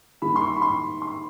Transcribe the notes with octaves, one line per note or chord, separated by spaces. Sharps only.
D#3 G3 A#3 B5
C6
C#6
B5
C6
C6